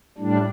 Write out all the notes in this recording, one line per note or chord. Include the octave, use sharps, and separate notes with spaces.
A2 G3 D4